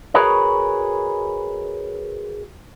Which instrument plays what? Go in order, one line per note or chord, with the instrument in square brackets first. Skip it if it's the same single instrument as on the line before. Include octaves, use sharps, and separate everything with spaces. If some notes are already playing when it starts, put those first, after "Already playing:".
[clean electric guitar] F#4 G#4 A#4 B4 C#5 D#5